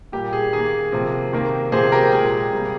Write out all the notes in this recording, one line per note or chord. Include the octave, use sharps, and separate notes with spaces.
A#2 G3 A#3 G4
G#4
D#3 A#3 G#4
C3 F3 A#3
C3 D#3 A#3
C3 F3 A#3 G#4 C5
G4 A#4
A#2 G#3 G#4
C3 G3 A#3